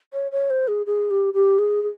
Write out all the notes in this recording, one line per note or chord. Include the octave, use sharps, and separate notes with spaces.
C#5
C#5
C5
G#4
G#4
G4
G4
G#4
G#4